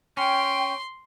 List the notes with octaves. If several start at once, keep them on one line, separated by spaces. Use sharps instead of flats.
C#4 G5 C6